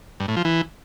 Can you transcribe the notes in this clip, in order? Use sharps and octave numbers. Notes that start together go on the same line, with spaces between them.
G2
A2
F3
E3